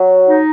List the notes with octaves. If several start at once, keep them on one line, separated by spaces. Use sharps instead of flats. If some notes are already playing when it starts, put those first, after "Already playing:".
Already playing: F#3
D#4